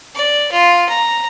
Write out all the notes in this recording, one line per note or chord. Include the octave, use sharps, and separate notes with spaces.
D5
F4
A#5